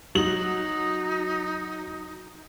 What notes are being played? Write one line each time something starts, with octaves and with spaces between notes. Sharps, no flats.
F#3 D#4 F#7